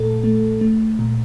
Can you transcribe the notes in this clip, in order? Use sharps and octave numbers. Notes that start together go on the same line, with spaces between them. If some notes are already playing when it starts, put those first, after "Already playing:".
Already playing: A#2 A3 A4
A3
A3
A#2